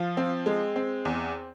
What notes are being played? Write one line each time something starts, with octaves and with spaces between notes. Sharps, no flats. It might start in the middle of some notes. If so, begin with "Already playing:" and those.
Already playing: F3 F4
C4
G#3
C4
E2